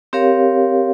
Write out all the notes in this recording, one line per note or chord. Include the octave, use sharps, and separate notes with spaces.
C4 G4 A#4 C#5 F5